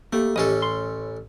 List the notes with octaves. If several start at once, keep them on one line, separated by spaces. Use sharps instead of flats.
A3 A#3 G4
A1 C#4 G4 A4 D#5
C6